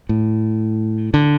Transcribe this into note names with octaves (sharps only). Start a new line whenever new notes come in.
A2
D3